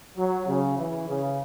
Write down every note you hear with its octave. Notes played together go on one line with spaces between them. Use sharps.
F#3
C#3
E3
C#3